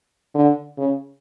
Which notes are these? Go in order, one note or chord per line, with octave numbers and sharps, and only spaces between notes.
D3
C#3